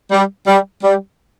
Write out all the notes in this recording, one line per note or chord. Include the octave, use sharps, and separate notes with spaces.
G3
G3
G3